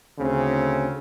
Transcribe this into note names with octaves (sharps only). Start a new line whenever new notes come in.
D2 C#3 C4